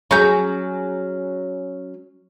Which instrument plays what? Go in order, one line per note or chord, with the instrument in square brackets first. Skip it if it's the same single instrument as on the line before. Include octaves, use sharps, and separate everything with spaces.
[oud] F#3 G#4 [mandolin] C#4 A#5 G6